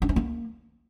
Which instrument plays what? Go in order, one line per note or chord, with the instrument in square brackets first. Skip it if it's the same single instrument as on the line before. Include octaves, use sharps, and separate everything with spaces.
[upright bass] D4
C#4
A#3